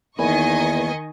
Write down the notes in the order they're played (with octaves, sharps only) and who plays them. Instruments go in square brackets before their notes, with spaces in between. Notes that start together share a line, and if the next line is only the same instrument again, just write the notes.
[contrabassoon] E2 [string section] D#3 D#5 C#6 [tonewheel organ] A#3 B4 [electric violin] G#5